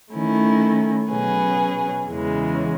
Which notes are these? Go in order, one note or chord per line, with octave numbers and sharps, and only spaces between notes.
D#3 A3 C#4 E4
B2 F#3 C#4 G#4 B4
E2 C#3 E3 G#3